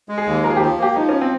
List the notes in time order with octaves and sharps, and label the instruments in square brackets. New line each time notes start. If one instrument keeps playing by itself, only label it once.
[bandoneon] G#3
[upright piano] G#4
[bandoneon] D#2
[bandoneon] F3 [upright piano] A#4
[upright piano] G#4
[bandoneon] F3 [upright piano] G4
[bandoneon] A#3 [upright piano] G4
[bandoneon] F3 [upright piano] D#4
[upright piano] C#4
C4